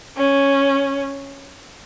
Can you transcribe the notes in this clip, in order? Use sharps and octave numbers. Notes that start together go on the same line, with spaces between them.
C#4